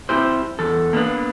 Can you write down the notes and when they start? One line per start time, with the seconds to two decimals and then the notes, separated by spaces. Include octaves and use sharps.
0.09 C4 C#4 E4 G4 C5
0.59 E2 A4
0.93 A#3 B3 D4 B4